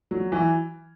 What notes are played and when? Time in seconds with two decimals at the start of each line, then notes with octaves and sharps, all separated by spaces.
0.11 F#3
0.32 E3